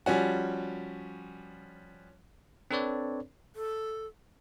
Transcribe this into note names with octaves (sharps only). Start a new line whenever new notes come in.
F3 G3 C#4 F#4
C4 D4 A4 B4 C#5 D5
A4